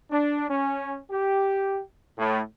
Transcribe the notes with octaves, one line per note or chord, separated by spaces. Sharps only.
D4
C#4
G4
A2